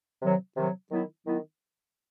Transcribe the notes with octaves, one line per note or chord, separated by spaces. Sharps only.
C3 D#3 F#3
C3 D#3 F#3
D#3 F#3 B3 E4
D#3 F#3 B3 E4